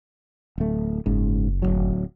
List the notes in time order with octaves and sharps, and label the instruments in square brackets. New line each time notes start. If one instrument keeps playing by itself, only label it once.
[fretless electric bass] D1 A3
[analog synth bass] F#1 [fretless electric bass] G#2 C#3
[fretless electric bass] D1 B1 F#3